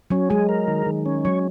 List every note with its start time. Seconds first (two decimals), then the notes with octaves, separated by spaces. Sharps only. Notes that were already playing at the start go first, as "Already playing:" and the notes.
0.10 F#3 C#4
0.30 G#3 G#4
0.49 A#4
0.68 D#3
0.87 D#3
1.06 C#4
1.25 F#3 C#5